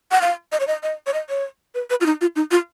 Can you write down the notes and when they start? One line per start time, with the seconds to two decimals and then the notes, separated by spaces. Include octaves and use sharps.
0.12 F#5
0.22 F5
0.52 D#5
0.60 C#5
0.67 D#5
0.83 D#5
1.07 C#5
1.14 D#5
1.29 C#5
1.75 B4
1.90 B4
2.01 F4
2.06 D#4
2.21 F4
2.36 D#4
2.51 F4